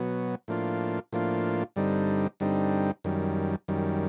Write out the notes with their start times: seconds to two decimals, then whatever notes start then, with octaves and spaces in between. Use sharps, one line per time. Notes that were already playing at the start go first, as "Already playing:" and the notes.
Already playing: B2 F#3 B3
0.48 A2 F3 A#3 D4 F4
1.12 A2 F3 A#3 D4 F4
1.76 G2 D3 G3 C4 D#4
2.40 G2 D3 G3 C4 D#4
3.04 F#2 D#3 G3
3.68 F#2 D#3 G3